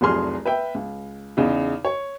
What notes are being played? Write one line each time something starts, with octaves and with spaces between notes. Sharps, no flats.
F1 C2 F#3 G#4 C6 F6
B4 E5 G5
C#2
E2 C#3 D#4
C#5